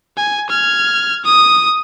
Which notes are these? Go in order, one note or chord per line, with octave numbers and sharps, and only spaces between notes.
G#5
F6 G#6
D#6